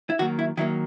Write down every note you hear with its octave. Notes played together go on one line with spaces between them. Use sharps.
E4
D#3 F#3 A#3 F#4
E4
D#3 F#3 A#3 E4